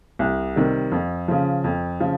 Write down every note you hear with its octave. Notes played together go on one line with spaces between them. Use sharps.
C2
C3 D#3 G3
F2
C#3 F3
F2
C#3 F3